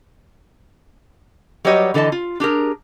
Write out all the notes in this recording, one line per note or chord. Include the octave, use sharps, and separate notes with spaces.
F#3 G3 G4 B4 C#5 D#5
D3 E3 A4 D#5 A5
F4
D4 G4 G#4 A#4